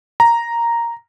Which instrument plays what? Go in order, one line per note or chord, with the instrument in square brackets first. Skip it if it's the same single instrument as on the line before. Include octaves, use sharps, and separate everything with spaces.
[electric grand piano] A#5